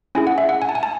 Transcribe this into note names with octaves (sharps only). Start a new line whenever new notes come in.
C#4 E4 G#4 G#5
F#5
E5
F#5
G#5
A5
G#5
A5